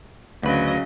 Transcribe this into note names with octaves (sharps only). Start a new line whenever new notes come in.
D2 C#3 F#3 B4 D#5